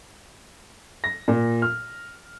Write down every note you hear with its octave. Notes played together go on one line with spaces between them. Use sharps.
A#6
A#2
F6